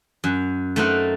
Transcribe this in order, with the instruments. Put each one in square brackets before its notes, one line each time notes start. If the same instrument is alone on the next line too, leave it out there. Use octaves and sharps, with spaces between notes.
[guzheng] F#2
A3 C4 D#4 A#4 F#5